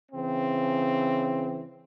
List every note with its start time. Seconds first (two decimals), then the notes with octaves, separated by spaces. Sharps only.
0.12 C#3 E3 C4